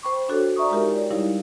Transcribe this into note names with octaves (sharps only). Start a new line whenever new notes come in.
C5 G5 B5 C#6 D6
D4 F#4 A4 C5 C#5
D5 E5 A#5 C#6 D#6
G#3 D#4 F4 G4 A#4
C#5 D5 G5
G3 D#4 E4 G4 C#5 F5